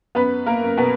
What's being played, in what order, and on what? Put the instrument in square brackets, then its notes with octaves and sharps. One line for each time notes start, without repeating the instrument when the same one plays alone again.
[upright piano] F#2 B3 B4
A#3 A#4
F#2
B2 B3